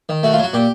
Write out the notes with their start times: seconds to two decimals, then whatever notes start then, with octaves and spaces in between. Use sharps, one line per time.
0.09 D#3
0.23 A3 F#4
0.33 F4
0.39 F#3 F#4
0.54 A#2 G4